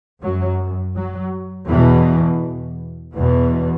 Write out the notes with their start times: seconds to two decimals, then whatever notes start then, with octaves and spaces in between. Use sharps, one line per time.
0.23 F#2 F#3
0.96 F#3
1.68 E2 B2 E3
3.15 E2 B2 E3